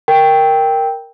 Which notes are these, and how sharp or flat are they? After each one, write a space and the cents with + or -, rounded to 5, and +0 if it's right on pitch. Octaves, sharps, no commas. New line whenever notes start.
A#4 +0 G5 +0